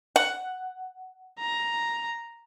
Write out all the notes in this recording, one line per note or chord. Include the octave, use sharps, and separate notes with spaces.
F#5
A#5